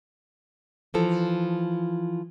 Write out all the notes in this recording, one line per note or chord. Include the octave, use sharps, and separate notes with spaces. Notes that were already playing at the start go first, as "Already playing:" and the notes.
E3 F3 A4